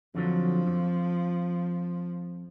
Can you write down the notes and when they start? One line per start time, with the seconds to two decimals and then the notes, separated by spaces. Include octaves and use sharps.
0.15 F2 D3 F3 F#3
0.67 F2